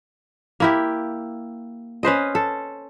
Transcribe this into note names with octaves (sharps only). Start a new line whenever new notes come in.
A#3 E4 G4
C#4 B4 C5 D#5
A4